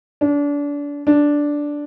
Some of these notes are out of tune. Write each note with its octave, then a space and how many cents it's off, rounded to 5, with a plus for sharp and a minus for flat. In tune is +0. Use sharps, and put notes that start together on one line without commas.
D4 -30
D4 -5